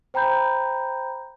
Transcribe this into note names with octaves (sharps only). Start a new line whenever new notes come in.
C5 G5 A#5 B5 G6